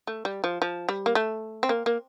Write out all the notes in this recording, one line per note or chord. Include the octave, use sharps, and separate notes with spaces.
A3
G3
F3
F3
G3
A#3
A3
C4
A#3
A#3